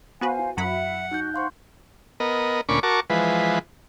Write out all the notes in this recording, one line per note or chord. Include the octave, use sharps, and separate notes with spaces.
B3 F#4 B4 C5 F5 G#5
E4
F#2 F#3 E5 F#5 B5
D#4 F#4 F#6 G6
C5 F5 F#5 C6 C#6
B3 A#4 D#5
D2 A#2 C#4 B5 C#6 D6
F#4 A#4 A5 C#6 D6
E3 F3 G#3 B4